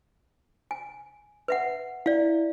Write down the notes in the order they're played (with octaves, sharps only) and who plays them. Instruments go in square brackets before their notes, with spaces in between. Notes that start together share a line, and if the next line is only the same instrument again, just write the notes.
[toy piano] G#5
B4 E5 F#5
[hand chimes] E4 [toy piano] D5 F5